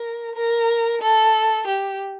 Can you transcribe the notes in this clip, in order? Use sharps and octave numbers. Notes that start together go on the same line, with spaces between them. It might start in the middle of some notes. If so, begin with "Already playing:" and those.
Already playing: A#4
A#4
A4
G4